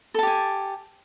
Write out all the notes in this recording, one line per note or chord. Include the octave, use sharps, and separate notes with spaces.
G4 A4 G#5 A5